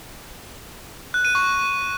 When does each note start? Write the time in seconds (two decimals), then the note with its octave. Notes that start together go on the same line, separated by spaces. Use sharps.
1.14 F#6
1.25 D#7
1.35 C#6